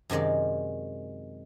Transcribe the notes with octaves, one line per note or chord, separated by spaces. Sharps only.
F#2 C3 D#3 G#3 D5